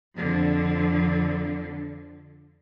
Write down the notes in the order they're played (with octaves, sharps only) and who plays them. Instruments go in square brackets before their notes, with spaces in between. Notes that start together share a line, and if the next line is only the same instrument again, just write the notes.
[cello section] F2 D3 F3